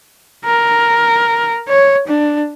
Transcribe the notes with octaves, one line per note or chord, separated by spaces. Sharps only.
A#4
C#5
D4